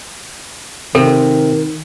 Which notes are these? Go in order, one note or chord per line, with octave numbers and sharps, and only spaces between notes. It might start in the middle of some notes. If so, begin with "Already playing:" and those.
C3 D#3 C4 A4 A#4